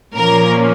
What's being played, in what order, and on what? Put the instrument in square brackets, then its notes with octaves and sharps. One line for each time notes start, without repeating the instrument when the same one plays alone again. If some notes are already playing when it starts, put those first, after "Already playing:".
[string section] A#2 F3 A#3 C#4 A#4